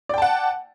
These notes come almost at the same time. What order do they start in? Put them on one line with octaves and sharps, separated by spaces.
D5 G5 A5 F#5